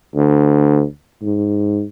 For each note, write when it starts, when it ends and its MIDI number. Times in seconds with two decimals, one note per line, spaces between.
0.16 0.83 38
1.22 1.84 44